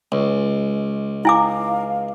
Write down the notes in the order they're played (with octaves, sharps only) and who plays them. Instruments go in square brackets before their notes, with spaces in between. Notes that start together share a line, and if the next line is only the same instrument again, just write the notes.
[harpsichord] C#2 [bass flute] G#3
[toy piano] E4 G#5 D6 [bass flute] F5